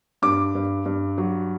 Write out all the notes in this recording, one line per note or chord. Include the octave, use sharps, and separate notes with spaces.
G2 D6
G2
G2
F#3